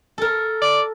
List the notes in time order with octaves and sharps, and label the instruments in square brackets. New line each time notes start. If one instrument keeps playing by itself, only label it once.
[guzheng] A4 A#4
[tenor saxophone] D5